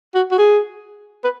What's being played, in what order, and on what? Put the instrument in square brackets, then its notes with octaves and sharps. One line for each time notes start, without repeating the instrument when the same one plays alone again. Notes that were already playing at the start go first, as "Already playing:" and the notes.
[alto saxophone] F#4
F#4
G#4
B4